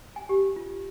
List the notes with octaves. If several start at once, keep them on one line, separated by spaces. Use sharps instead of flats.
G#5
G4
F4